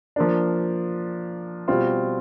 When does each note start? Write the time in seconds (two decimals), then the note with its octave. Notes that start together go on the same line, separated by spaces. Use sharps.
0.16 F3 A#3 D4
1.68 B2 G3 C4 F4